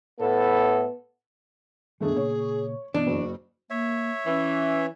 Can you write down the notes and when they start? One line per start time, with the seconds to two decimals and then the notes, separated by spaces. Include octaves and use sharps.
0.20 A2 B3 A4
2.01 F#2 B2 D#3 G3 A3 D4 G#4
2.16 A#2 C#3 A#3 C#5
2.94 G1 B2 E3 C#4 D4
3.07 F#1 F#4
3.70 A#3 C#5 E5
4.26 E3 C#4